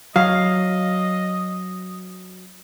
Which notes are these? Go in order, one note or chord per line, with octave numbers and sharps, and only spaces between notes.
F#3 D#5 F5